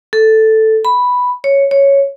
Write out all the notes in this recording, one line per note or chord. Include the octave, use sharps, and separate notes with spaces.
A4
B5
C#5
C#5